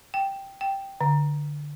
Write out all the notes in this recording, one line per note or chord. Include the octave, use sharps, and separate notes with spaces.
G5
G5
D3